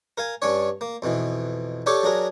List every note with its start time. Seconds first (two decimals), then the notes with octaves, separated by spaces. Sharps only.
0.18 A#4 F5 G#5
0.42 G2 C#4 D4 C#5
0.81 A#3
1.02 F2 B2 E3
1.86 D4 G4 A4 C#5 A5
2.03 F#3 D4 G#4 A#4